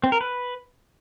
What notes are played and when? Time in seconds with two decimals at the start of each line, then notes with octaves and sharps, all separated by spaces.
0.04 C4
0.12 A#4
0.21 B4